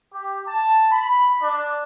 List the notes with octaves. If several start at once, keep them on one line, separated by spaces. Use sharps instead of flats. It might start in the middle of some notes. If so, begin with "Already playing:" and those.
G4
A5
B5
D4